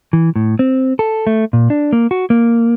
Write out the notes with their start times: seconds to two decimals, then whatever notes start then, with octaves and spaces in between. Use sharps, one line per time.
0.13 E3
0.36 A2
0.59 C4
0.99 A4
1.27 A3
1.53 A#2
1.70 D4
1.93 A#3
2.11 F#4
2.30 A#3